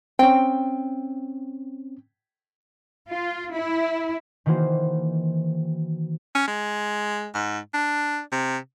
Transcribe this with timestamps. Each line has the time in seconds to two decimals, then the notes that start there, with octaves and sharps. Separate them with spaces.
0.19 C4 C#4 G5
3.10 F4
3.55 E4
4.46 D#3 E3 A#3 F#4 C5
6.35 C#4
6.48 G#3
7.34 G#2
7.73 D4
8.32 C3